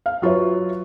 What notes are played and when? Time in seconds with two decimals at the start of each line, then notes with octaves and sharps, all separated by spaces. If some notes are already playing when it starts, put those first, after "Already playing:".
0.06 F5
0.22 F#3 F4 B4 C#5 E5